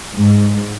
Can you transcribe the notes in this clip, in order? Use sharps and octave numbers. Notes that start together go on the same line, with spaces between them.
G#2